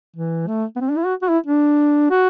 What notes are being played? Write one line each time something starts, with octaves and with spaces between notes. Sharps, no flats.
E3
A3
B3
C4
D4
E4
F#4
F#4
E4
D4
F#4